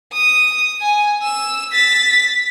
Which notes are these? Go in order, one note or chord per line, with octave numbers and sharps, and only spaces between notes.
D#6
G#5
E6
A6 B6